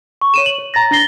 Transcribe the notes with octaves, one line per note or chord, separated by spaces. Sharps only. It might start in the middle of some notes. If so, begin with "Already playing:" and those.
C#6
C#5 D#7 E7
F#7
C#5
A#5 A6 A#6
D4 A6 A#6 C7 G7